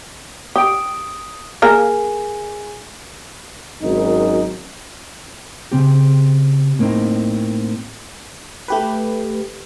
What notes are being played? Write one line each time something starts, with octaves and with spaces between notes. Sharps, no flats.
G4 D#6 D7
A#3 G#4 A#4 G#5
G#1 F#2 D#4
C#3 C4 G4
A2 A#3 C4 D#4
A3 G4 B4